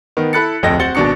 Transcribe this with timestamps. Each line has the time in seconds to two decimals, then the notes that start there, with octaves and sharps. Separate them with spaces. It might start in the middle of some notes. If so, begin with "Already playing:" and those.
0.17 D#3 B3
0.33 E4 A4 B5 F#6 A6 C#7
0.63 D1 F2 A4 D#5 G5 A#6
0.79 C4 F#4 F#5 A6 C#7 G7
0.95 G#1 B2 D4 C#6 C#7